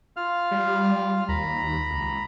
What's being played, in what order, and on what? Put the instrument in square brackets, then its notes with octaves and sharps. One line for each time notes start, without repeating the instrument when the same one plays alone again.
[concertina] F4 F5 F6
[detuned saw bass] G3
[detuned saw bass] D#2 [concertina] A#5 B5
[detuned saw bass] C#2